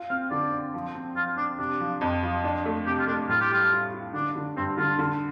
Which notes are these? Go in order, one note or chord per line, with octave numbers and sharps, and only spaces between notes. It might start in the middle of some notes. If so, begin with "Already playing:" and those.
Already playing: F4
C4 F5
D3 D5
C4
F3
C4
F3 F4
C4 D4
C3 D4
F3
F2
F3
D4
A3
C3 G4
F4
A3 D4
A2 F4
G4
G3 F4
F4
F4
D3 D4
D3
G2 C4
D3 F4
D3